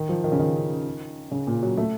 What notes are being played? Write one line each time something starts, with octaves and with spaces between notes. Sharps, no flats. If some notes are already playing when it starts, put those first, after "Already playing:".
Already playing: D#3
F3
D#3
C#3
D#3
C#3
A#2
F#3
A3